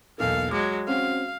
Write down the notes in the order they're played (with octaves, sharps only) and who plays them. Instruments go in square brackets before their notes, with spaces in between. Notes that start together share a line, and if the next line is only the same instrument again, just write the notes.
[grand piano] B1 E2 A#3 [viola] A4 F5
[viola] F#3 G#3 [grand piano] D6
[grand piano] C4 C#4 F#4 [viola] F5